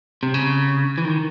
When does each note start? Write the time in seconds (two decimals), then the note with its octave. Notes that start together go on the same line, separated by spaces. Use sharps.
0.23 C3
0.34 C#3
0.98 E3
1.05 D#3